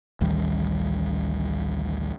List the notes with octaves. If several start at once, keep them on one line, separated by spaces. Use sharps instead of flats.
A1 D2 D#3 G3